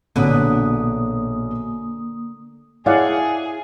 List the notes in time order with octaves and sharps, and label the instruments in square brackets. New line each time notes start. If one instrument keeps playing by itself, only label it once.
[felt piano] A#1 B2 C#5 [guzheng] D3 B4 [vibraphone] A#3 D#6
[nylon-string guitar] E4 C#5 [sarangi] G#4 [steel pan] D5 F5 F#5